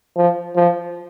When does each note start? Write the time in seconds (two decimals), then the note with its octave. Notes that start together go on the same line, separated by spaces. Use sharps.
0.16 F3
0.56 F3